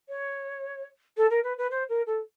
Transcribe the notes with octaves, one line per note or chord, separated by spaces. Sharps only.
C#5
A4
A#4
B4
B4
C5
A#4
A4